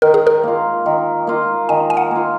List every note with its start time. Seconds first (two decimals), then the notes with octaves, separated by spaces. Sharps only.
0.02 D#3 A#4
0.14 G#4
0.27 A#4
0.43 A#3 F4
0.86 D#3
1.27 A#3 F4
1.69 D#3 G#5
1.90 G#5
1.97 F#5
2.11 A#3 F4